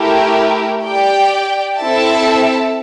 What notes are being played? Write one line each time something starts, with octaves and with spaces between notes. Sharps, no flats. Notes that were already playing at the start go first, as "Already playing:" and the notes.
Already playing: A3 E4 G4 A#4
G4 D5 G5
C4 E4 A4 E5 A5